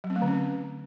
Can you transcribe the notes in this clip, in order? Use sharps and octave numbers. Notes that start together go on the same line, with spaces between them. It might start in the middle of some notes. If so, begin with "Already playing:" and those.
F#3
C4
A3
D3
C#4